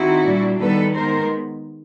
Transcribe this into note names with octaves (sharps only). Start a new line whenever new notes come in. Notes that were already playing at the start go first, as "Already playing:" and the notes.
Already playing: D#3 C4 D#4 E4 F#4
A#2 G3 A#3 D4
D#3 G3 B3 A4 B4
D#3 G#3 B3 A#4 C5